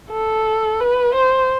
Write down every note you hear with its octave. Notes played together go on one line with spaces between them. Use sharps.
A4
B4
C5